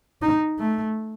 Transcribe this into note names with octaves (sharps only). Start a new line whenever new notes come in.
D#4
A3